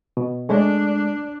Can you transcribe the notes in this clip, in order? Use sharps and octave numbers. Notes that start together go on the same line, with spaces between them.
B2
G#3 A3 D4